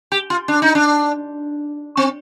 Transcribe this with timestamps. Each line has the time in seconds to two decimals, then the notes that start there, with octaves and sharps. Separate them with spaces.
0.12 G4
0.30 F4
0.48 D4
0.62 D#4
0.75 D4
1.97 C4